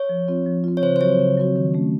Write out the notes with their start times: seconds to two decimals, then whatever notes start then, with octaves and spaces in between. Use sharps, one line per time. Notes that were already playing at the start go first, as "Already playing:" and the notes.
Already playing: C#5
0.09 F3
0.28 C4 F4
0.46 F3
0.64 C4 F4
0.77 C#5
0.82 C#3 C5
0.96 C5
1.01 F#3 C4 F#4 C#5
1.19 C#3
1.37 F#3 C4 F#4
1.56 D#3
1.74 A3 C#4